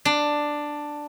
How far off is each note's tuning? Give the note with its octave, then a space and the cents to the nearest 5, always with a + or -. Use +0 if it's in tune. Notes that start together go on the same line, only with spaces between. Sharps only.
D4 +5